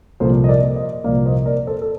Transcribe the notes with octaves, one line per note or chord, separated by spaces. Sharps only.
C2 A#2 F3 A#3 A4 C5
D#5
A#4 D5
C5 D#5
C2 A#2 F3 A#3 D5 F5
C5 D#5
A#4 D5
A4 C5
A4